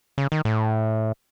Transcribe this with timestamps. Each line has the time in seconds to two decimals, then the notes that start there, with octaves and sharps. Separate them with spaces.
0.18 C#3
0.32 D#3
0.45 A2